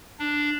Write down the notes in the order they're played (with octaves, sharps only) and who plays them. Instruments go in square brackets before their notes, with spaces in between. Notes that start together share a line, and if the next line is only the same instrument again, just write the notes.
[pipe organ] D4